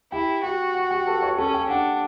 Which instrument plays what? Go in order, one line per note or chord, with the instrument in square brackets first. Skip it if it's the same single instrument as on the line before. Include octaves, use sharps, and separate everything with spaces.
[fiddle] E4 [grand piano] G4 G5
[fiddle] F#4 [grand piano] G4 G5
[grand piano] F#5
G4 G5
A4 A5
C#5 C#6
[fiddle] C#4 [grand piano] A4 A5
[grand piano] G4 G5
[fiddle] D4 [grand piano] F#5